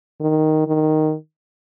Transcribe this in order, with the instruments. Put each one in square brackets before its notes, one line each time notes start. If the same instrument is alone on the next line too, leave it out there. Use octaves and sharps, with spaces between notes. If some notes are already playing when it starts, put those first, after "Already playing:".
[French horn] D#3
D#3